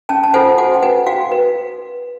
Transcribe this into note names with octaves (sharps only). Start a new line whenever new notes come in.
C#4 G5 A5
A5
F4 A4 C5 F#5 G#5
F#4 F#5 G#5
G5
B4 F#5 G#5
F#4 F5 G5
B4